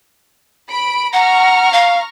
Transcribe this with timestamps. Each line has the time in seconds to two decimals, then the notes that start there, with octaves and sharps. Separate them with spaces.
0.70 B5 D7
1.13 F#5 A#5 C#6 F6
1.73 F5